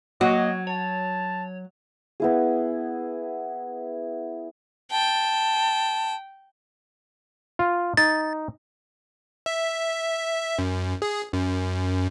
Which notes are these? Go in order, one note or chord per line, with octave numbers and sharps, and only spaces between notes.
F#3 A#3 F#4 D#5
C#5 A5
B3 E4 G#4
G5 A5
F4
D#4 A6
E5
F#2
G#4
F#2